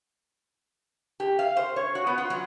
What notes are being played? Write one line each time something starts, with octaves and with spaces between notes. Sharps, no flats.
G4
F5
C5
C#5
F#4
B3
F4
F#3